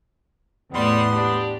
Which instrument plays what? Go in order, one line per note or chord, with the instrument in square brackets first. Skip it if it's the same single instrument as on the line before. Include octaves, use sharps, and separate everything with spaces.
[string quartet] E2 A2 C6 [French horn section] G3 [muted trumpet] B3
[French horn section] D4 G4